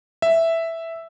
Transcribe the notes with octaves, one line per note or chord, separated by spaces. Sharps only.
E5